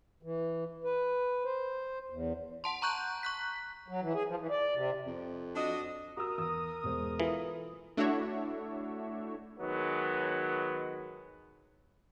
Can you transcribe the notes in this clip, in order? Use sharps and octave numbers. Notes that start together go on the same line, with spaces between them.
E3
B4
C5
E2
F#5 A5 C6
A#5 C#6 F#6 G6
C#6 F#6 B6
F#3
E3
G#4
F3
E3
D5
C3
F2
D4 F#4 D#5
F#4 A#4 A#5 D#6 E6
E2 E6
E1 G#3 C5
E3 F4 A4
A3 D4 E4 F#4 C#5 E5
D#3 F#3 G#3 B3